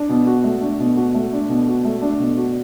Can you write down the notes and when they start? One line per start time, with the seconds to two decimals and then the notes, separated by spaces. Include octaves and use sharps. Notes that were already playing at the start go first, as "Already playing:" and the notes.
Already playing: D4
0.09 B2
0.27 F#4
0.44 A3
0.61 D4
0.79 B2
0.97 F#4
1.14 A3
1.33 D4
1.49 B2
1.68 F#4
1.85 A3
2.02 D4
2.19 B2
2.37 F#4